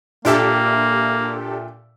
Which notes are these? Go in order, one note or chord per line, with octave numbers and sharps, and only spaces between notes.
A#2 A#3 D4 G4 A4 E5 G5